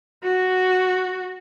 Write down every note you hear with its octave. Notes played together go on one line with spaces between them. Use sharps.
F#4